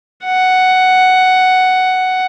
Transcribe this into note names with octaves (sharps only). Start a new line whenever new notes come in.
F#5